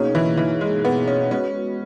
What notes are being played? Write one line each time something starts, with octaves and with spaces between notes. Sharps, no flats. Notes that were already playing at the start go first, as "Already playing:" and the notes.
Already playing: B2 A#3 C#4 D#4 G#4
E3
E3
G#3
B3
C#4
G#3 B3 C#4 F#4 B4